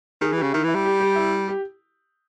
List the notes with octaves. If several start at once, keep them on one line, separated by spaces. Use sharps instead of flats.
D#3 G#4
E3 G4
C#3
D#3 E4
E3 E4
G3
G4
G4
E4
G4